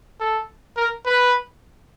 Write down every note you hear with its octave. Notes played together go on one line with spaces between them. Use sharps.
A4
A#4
B4